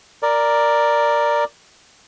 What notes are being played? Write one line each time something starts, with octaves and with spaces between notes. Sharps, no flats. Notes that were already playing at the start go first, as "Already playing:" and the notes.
A#4 D5